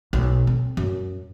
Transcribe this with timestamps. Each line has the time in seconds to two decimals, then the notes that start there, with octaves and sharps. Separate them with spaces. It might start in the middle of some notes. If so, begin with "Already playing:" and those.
0.13 B1
0.47 C4
0.77 F#2